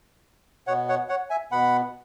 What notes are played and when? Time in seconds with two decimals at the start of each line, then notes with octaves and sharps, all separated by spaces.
0.67 B2 B3 C#5 F#5
0.89 C#5 F#5
1.09 C#5 F#5
1.30 E5 G#5
1.52 B2 B3 F#5 B5